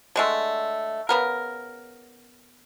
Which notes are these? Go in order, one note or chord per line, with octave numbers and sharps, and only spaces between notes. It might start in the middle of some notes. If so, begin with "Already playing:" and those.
D3 G#3 A3
C#3 B3 A#4